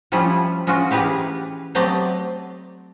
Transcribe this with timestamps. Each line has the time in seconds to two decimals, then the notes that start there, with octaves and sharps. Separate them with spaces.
0.12 F3 G3 A3 C#4 E4 F4
0.67 G#3 C#4 F4 F#4
0.91 E3 G4 G#4 B4 A#5
1.75 F#3 A3 C4 G4 D5 D#5